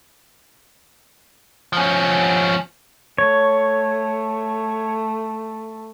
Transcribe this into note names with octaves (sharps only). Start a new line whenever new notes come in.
F3 C#4
A3 C#5